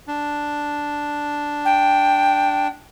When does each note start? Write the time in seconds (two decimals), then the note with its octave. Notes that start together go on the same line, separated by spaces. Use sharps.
0.08 D4
1.65 G5